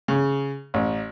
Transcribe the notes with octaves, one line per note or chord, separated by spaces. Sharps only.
C#3
A1